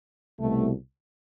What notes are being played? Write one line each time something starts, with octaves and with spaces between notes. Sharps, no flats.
C2 B2 A3